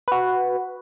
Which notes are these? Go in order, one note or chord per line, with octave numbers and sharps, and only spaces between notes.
F#4 B4